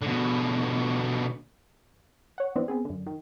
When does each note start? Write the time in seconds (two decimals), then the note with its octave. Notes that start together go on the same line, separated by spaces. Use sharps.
0.03 B2 D3
2.38 C#5 F#5
2.55 E3 B3 C4 D4
2.68 B3 C4 G#4
2.85 F#2 D3
3.06 D#3